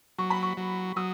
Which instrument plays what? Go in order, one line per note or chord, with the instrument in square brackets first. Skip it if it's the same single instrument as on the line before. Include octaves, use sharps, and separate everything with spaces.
[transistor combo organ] F#3 [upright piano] C#6
[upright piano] B5
C#6
[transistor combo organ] F#3
[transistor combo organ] F#3 [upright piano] D#6